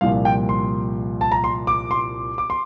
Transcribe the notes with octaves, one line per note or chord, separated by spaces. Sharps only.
C2 A#2 F3 F5
G5
C6
A5
A#5
C6
D6
C6
D6
C6